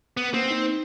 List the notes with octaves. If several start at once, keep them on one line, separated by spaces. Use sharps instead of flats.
B3
A#3 C4
D#4